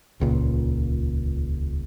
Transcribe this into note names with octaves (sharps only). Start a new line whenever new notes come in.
D#1 C#2 A#2